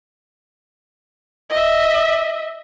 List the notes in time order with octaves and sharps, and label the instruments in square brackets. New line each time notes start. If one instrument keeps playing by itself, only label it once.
[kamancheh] D#5 E5